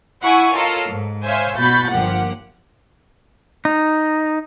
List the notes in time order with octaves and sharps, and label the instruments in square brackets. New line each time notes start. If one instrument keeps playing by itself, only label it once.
[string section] E4 E5 F#5 G#5 C#6
F4 A4 A#4 C#5 D#5 F5
G#2
C5 C#5 E5 F5 G#5
B2 F#4 B5 G6 A6
G1 F3 A#3 G4 F#5
[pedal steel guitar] D#4